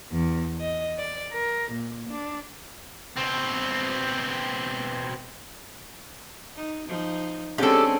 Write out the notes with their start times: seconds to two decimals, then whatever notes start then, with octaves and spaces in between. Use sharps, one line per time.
0.12 E2
0.59 D#5
0.97 D5
1.33 A#4
1.72 A#2
2.10 D4
3.16 B2 C4
6.56 D#4
6.88 F3 D#4
7.58 D3 G#3 C4 C#4 G4 A4